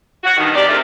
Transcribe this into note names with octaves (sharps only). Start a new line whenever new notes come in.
F#4
G2 B2 D#3
C3 D#3 G4 D5
G#2 C3 D#3 A3 D4 F4